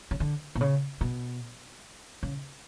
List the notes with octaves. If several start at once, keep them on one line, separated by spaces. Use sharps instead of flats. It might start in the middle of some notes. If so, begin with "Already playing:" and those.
C#3
D3
B2
C#3
B2
C#3